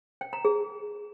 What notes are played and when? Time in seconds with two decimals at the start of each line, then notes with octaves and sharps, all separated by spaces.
0.21 G5
0.33 A#5
0.45 G#4